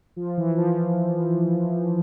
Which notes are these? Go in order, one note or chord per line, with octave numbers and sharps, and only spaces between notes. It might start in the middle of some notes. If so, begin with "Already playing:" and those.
F3
E3
F3